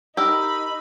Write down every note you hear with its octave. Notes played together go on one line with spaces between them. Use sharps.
D#4 G4 A#4 B5 E6